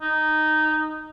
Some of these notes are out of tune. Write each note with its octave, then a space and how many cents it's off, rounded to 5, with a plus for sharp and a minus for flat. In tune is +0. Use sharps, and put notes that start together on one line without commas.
D#4 -10